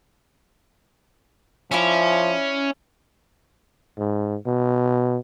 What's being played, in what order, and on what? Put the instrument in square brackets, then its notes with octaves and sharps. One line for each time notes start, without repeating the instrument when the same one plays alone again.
[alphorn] F3 [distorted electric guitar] C#4 [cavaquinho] E4 D5 E5
[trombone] G#2
B2